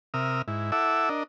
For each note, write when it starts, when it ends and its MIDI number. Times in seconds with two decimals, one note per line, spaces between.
0.14 0.42 48
0.14 0.42 70
0.14 0.42 76
0.14 0.42 87
0.14 0.42 89
0.48 0.71 44
0.48 0.71 64
0.72 1.09 64
0.72 1.09 69
0.72 1.09 76
0.72 1.09 78
0.72 1.09 86
0.72 1.09 88
1.09 1.23 62
1.09 1.23 70
1.09 1.23 75